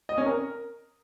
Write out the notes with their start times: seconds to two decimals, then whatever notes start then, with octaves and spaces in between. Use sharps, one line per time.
0.09 D#5
0.18 C#4
0.26 A#4